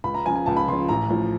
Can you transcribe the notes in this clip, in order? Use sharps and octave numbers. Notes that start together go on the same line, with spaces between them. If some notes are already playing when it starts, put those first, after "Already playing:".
C#2 B5
A#5
C#3 F3 G#5
G#5
C#2 A5
B5
C#3 F3 C6
A1 A#5
A2 F3